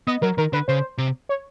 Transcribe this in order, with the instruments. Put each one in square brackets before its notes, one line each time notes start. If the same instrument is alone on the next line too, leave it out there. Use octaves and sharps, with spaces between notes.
[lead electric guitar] B3 [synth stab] D#5
[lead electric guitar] F#3 [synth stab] A#4
[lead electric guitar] D#3 [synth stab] A#4
[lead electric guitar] D3 [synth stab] B4
[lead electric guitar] C#3 [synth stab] C5
[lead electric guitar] C3
[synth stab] C#5